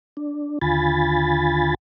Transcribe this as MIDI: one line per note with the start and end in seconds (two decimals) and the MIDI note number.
0.17 0.59 62
0.62 1.75 39
0.62 1.75 50
0.62 1.75 65
0.62 1.75 80
0.62 1.75 83
0.62 1.75 93